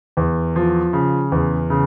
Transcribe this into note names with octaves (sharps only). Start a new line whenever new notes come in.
E2
F3
C#3
E2
C#3